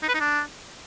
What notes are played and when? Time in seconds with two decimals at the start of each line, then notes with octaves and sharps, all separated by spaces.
0.03 D#4
0.09 B4
0.14 D#4
0.20 D4